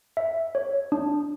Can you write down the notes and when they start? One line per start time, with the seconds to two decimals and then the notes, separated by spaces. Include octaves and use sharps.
0.17 E5
0.55 C#5
0.92 D4